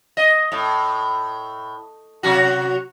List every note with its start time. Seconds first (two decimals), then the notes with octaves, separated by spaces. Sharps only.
0.17 D#5
0.52 A2
2.23 C3 F#3 F#4